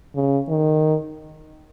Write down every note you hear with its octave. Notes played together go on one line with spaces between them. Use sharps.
C#3
D#3